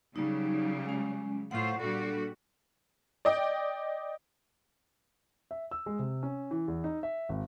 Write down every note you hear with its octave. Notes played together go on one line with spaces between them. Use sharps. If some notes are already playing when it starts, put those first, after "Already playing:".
C#3 F#3 G3 D#4
G#3 C#4
A2 F4 C5 F#5 C#6
A#2 G3 D4 F#4 A4
D5 D#5 G5
E5
E6
G#3
C3
C#4
E3
E2
D#4
E5
G#1